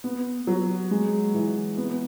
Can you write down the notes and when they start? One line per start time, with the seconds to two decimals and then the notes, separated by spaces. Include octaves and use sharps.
0.04 B3
0.47 F#3
0.91 G#3
1.34 E3
1.78 B3